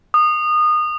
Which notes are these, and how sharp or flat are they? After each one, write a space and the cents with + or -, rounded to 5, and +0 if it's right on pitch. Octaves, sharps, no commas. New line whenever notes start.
D#6 -25